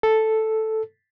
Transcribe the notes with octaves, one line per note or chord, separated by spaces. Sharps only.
A4